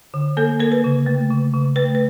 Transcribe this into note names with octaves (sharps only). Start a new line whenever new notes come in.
D3
A#3 A4
A#3 A#4
B4
C#3
A3
C#3
C#3
A3 B4
B4